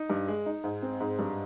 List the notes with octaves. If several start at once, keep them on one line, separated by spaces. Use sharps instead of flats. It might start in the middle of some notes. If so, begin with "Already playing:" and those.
Already playing: D#4
G2
G#3
D#4
G#2
C4
G#2
G2